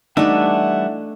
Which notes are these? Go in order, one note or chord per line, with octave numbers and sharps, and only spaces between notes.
E3 G3 A3 D4 D#4 E5 F#5